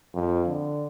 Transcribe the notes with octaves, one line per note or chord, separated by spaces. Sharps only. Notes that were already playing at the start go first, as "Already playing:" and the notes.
F2
D3